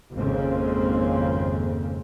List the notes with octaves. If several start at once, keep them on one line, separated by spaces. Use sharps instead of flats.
G#1 F2 G#2 C#3 A#3 C4